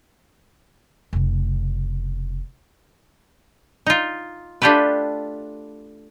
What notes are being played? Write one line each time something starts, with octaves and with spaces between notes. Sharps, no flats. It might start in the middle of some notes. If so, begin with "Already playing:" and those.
F1 C#3
D#4 F4
A3 D4 F4 G4 A4 B4